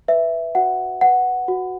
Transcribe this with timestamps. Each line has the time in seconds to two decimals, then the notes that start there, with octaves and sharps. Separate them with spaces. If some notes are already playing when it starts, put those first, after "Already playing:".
0.08 B4 E5
0.55 F#4 F#5
1.01 B4 F#5
1.48 F#4